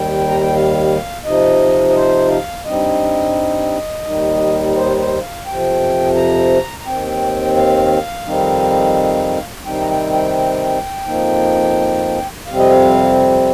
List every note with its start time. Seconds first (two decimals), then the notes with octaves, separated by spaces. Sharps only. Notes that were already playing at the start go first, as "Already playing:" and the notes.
Already playing: D#2 D#3 G3 G5
0.28 A#5
0.41 G5
0.55 F5
1.25 C3 F3 D#4 D#5
1.89 D#5
1.96 C5
2.31 F5
2.65 G2 G3 C4 D#4 D#5
4.05 D#2 D#3 G3 D#4
4.76 C5
4.99 C5
5.22 F5
5.46 F2 C3 F3 G5
6.16 A#5
6.79 A#5
6.86 D#2 D#3 C4 G5
7.56 F5
8.26 F2 D#3 G3 C4 D#4
9.66 C3 D#3 G3 C4 D#4 G5
9.81 A#5
9.90 G5
10.13 G5
10.37 G5
11.07 F2 F3 A#3 D#4
12.46 F2 C3 G3 C4 F5
12.59 D#5
12.70 F5